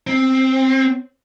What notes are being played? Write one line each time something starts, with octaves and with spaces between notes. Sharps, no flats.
C4